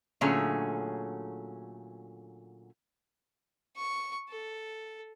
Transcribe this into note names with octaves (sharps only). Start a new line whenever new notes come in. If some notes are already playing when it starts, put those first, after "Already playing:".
A#2 D3 F#3 A3 C#4 G#4
C#6
A4